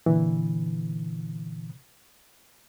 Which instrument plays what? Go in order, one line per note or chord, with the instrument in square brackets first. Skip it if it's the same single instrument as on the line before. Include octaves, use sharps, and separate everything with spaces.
[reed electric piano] A#2 D3 E3